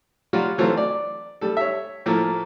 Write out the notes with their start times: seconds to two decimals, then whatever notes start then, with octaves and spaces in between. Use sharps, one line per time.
0.33 F#3 G3 F4 F#4
0.58 E3 F#3 A3 C4 F4
0.77 D5
1.41 G3 A4
1.57 C#5 E5
2.06 A2 F3 A3 A#3